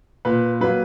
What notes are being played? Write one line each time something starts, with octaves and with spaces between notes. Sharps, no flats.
A#2 B4
F#3 A#3 B4